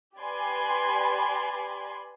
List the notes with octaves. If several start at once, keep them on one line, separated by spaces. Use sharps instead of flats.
G4 B4 D5 G#5 B5 C6